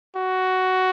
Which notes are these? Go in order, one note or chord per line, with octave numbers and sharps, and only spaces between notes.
F#4